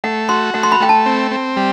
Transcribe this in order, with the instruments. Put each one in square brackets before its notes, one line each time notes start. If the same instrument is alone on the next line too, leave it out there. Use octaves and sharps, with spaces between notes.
[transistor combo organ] A3 [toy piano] F#5
[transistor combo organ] F#4 [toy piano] C6
[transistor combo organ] A3 [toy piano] F#5
[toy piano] C6
B5
[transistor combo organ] A3 [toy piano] G5
[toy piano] A5
[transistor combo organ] C4
C4
G3